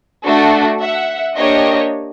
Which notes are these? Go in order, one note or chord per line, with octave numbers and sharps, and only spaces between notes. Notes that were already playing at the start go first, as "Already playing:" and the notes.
A3 D4 F#4 A4
E5 F#5
A#3 D4 G4 C#5 D#5